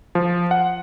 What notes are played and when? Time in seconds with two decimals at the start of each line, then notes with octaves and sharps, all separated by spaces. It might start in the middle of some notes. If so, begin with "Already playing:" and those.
0.15 F3
0.51 F#5